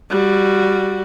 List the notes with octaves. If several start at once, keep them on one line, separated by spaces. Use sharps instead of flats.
G3 F#4